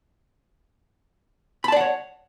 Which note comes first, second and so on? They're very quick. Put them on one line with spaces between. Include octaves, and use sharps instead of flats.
B5 A5 D5 F#5 C#5